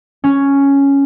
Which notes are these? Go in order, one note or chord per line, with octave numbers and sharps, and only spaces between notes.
C#4